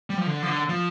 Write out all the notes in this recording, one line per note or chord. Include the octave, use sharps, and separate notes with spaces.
G3
F3
D3
F3
D3
F3